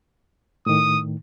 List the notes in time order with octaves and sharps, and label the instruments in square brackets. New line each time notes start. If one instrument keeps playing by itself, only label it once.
[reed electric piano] A2 D#3 [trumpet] D#6